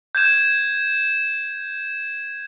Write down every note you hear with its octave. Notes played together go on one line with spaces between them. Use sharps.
G6 G#6 E7